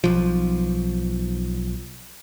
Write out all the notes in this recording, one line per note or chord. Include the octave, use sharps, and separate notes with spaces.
B1 F3